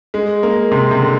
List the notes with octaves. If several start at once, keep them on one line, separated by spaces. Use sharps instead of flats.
G#3
A#3
C3
C3
D3